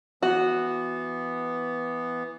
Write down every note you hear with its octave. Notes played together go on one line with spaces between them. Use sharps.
E3 B3 F#4